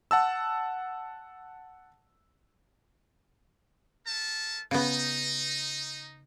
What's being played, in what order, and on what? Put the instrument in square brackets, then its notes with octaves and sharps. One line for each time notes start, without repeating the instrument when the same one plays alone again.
[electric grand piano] F#5 A5 E6
[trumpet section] A3 A#4 A5
[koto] C#3 B3 [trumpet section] D#4